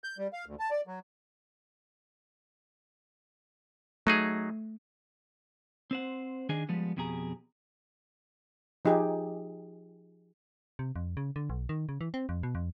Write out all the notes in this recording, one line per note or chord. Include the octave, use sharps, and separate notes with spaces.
G6
G3
F5
D2
A5
D5
F#3
F#3 A3 D#4 G#4
C4 C5 F#5
D#3 D4 G#4 D5 D#5 G#5
F3 G3 G#3 B3
F2 B2 G4 G#4 A#5
F3 D#4 G4 G#4
C3
F2
C#3
D3
B1
D#3
C#3
E3
C4
F2
B2
F2